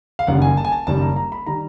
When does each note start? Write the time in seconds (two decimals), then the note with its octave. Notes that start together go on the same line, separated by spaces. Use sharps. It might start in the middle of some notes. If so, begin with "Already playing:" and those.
0.19 F5
0.27 F#1 F#2 D#3 G3 F#5
0.42 G#5
0.57 A5
0.65 G#5
0.72 A5
0.87 F#1 F#2 D#3 G3 A5
1.02 A#5
1.16 A#5
1.32 B5
1.46 D#3 G3 A#5